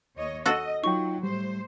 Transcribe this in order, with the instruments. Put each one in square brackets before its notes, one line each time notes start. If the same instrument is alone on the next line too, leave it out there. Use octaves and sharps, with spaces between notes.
[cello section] D#2 C#5 D#5
[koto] F#4 A4 [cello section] D#5
[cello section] F#3 [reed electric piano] D#4 F4 G5 [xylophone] C#6
[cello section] A2 C5 [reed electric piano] G3